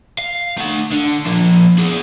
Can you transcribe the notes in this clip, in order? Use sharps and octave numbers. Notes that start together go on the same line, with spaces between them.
F5
A3 F#5
D3
F3 A#3
B3 G#4